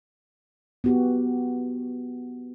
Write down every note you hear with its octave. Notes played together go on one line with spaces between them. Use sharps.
B3 F#4 G4